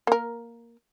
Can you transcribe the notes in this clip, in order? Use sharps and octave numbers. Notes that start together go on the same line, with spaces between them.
A#3 A#4